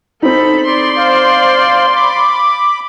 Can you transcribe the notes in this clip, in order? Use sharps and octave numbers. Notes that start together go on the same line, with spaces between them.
C4 D#4 A4 B5
D5 C6
C5 F5
B5 D6